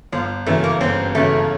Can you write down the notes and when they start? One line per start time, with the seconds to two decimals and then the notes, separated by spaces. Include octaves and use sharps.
0.12 G1 F3
0.46 F#2 C#3 E3 A3
0.64 A#3
0.80 G1 C4
1.15 F#2 C#3 E3 A3